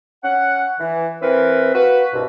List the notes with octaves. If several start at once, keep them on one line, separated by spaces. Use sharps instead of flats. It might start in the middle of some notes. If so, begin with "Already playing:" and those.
C#4 F#5
E3
E3 C4 A#4 B4
A#3 F#4 B4
C2 G2 B2